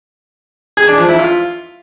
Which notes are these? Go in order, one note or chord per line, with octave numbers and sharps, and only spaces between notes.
G#4
D4
F3
E4
F4